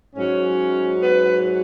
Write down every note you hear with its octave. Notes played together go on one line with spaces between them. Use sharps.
G#2 F#3 C#4
B4